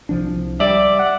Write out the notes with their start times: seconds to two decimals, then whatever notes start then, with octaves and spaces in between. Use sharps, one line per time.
0.09 C2 F3 D4
0.60 G3 D5 E5
0.99 F#5